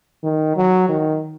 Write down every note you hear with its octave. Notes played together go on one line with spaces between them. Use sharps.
D#3
F#3
D#3